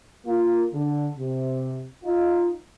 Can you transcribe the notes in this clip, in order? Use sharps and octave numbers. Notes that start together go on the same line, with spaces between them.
A#3 F4
D3
C3
D#4 F4